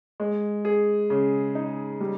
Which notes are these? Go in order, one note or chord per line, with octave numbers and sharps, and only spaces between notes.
G#3
G#4
C#3
D#4
G3